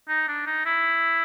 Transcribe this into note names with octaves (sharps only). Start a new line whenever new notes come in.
D#4
D4
D#4
E4